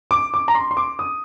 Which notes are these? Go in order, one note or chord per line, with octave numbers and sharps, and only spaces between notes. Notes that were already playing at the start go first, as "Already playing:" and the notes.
D6
D6
A#5
C6
C6
D6
D#6